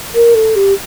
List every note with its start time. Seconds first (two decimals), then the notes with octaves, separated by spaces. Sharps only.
0.14 A#4
0.34 A4
0.55 G4